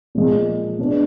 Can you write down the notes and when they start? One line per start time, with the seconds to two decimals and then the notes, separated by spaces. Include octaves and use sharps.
0.15 A#2 F3 G#3
0.79 G#3 B3 D4